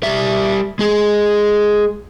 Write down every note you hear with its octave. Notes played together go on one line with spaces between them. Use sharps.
G3 E5
G#3 G#4